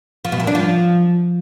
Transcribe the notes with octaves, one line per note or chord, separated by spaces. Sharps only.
F3
B2
A#2
D4
F3